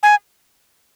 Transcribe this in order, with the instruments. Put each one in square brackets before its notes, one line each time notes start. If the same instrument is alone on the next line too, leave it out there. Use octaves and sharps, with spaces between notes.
[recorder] G#5